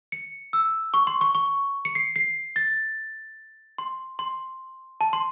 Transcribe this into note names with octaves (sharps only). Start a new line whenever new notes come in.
C#7
E6
C#6
C6
C#6
C#6
C#7
C7
C7
A6
C6
C6
A5
C6